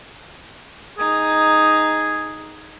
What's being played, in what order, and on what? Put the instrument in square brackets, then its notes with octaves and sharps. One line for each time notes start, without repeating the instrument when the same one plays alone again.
[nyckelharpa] D#4 [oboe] G#4